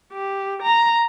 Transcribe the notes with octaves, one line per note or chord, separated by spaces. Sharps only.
G4
A#5